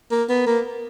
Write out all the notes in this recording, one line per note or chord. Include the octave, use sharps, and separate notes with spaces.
A#3
B3
A#3